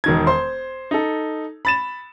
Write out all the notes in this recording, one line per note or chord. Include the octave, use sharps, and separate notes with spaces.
E1 D#3 G#6
C5 C6
D#4 A4
B5 A6 E7